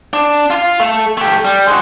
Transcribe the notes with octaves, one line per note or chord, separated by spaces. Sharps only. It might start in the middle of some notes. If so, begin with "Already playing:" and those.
D4
F4 F5
A3
A3 G4
G3
G#3 F#4